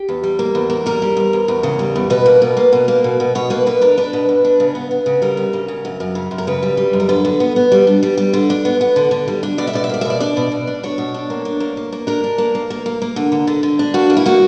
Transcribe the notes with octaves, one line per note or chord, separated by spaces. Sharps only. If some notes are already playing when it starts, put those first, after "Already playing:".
Already playing: G4
E2
G3
A#3
E2
A#3
G3 A#4
G3
E2
E2
E2
C#3
G3
E2
B2 B4
A#3
B2
A#3
B2
A#3
B2
B2
B2 C#5
A#3 B4
B2 B4
D4 A#4
D4 B4
B2
B2
D4
C#3
B3
B3
C#3
G3 A#4
F#2
C#3
C#3
F#2
F#2
C#3
F#2
A#4
C#3 B4
G3
G3
F#2
A#4
D3 B4
D3
B3
B3
G3
D4
G3
G3
D3
D4
B3
B3
D3
D3
G3
D4
B2 D5
E5
B2 D5
E5
A#3 D5
E5
B2 D5
D4 D5
B2
B2
D4
D4 C#5
B2
D4
A#3
D4
A#3
A#3
A#3
D4 A#4
D4
A#3
A#3
A#3
A#3
A#3
D3
D3
D3
D3
D4
A#3 F#4
A#3
E4
A#3 F#4